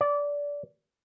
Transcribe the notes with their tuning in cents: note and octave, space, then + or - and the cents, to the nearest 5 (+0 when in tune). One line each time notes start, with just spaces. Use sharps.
D5 -20